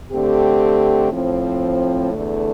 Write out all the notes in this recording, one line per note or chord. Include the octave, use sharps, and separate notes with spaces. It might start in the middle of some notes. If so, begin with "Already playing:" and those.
D3 A3 C4 G4
A2 F3 C4
E2 D3 A3